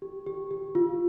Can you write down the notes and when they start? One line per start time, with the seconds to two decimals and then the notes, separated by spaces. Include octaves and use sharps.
0.02 G4
0.27 G4
0.51 G4
0.75 F4